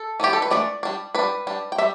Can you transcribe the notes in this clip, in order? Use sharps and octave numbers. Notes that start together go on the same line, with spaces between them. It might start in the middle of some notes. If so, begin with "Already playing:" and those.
Already playing: A4
E3 B3 D4 G4
A4
B4
E3 A3 D4 D5
G3 D4
G3 D4 B4
G3 D4
G5
G3 E5